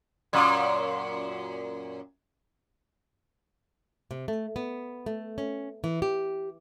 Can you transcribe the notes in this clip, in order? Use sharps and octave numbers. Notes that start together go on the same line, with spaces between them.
F#2 A#2
C3
A3
B3
A3
C#4
E3
G4